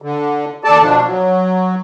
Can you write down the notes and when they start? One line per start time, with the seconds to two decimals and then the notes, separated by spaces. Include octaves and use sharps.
0.02 D3
0.64 D#2 A4 D5 A5
0.81 B2 F3 D4
1.05 F#3